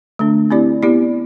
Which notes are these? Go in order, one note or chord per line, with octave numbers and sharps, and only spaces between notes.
D3 A3 D4
C4 E4 G4 D5
B3 E4 G4 D5